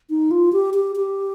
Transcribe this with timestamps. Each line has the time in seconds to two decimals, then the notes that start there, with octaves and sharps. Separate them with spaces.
0.10 D#4
0.31 F4
0.53 G4
0.74 G4
0.96 G4